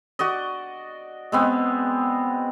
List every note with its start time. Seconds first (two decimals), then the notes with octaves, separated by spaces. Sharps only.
0.19 F#4 D5 D#5
1.32 G#3 B3 C4